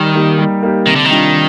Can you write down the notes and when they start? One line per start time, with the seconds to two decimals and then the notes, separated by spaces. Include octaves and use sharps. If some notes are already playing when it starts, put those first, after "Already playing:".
Already playing: D#3 G3
0.15 A#3 D#4 G4
0.38 G3
0.63 A#3 D#4 G4
0.86 C3 D#3
0.96 D3
1.05 D#3
1.11 G3 D4 F4